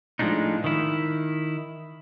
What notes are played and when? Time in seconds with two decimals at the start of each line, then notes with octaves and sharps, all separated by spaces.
0.19 A2 F3 F#3 G#3 D4 D#4
0.64 D#3 E4